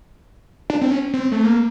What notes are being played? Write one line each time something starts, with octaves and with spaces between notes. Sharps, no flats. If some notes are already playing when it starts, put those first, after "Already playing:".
D4
C4
C#4
C4
A3
A#3